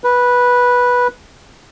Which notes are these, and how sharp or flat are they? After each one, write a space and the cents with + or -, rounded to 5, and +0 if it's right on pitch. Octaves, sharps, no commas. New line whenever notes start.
B4 -10